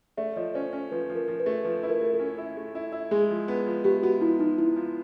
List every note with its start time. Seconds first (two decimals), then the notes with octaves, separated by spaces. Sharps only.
0.17 A3 D5 E5
0.36 F3 C#5 D#5
0.54 C#4 C5 D5
0.73 C#4 C5
0.91 F3 B4
1.10 F3
1.15 A#4
1.28 F3
1.40 B4
1.46 A3
1.64 F3 B4
1.83 E4 B4
1.89 A#4
2.02 A3 A#4
2.14 A4
2.19 C#4
2.38 E4
2.57 A3
2.75 E4
2.92 E4
3.11 G#3 G#4
3.30 F3
3.48 B3
3.66 F3
3.84 B3 G4
4.03 B3 F#4
4.21 F3 E4
4.39 F3 D#4
4.58 F3 E4
4.76 F3